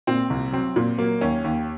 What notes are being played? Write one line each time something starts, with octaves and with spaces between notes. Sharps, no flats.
A#2 C4
C2
F#3 C4
A#2
F#3 A#3
D#2 C#4
D#2